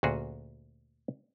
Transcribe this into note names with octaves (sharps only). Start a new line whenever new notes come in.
D2 A#2 C#4 F#4 G#4